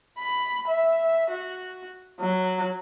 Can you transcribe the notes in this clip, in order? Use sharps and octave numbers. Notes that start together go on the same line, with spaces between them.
B5
E5
F#4
F#3